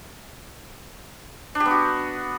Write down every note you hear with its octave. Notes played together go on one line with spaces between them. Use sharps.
D4
G4
B3
F#4